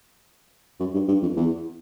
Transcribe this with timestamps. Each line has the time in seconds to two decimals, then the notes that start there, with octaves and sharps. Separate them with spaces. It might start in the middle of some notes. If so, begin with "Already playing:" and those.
0.80 F#2
0.94 G2
1.08 G2
1.22 F2
1.36 E2